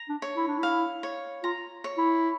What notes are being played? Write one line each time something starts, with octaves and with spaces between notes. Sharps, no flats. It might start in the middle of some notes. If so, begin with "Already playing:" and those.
Already playing: A#5
D4
C#5
E4
D4
E4 F5
C#5
F4 A#5
C#5
E4